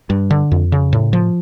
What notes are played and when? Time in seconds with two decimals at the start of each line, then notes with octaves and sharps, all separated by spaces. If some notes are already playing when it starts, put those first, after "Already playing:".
0.10 G2
0.31 D3
0.52 F2
0.72 C#3
0.93 A2
1.13 F3